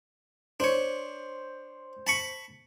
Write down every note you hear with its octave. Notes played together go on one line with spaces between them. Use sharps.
D4 C5 C#5
A5 B5 C#6